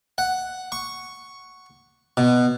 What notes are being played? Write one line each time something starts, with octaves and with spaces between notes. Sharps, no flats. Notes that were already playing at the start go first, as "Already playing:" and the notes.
F#5
C#6
B2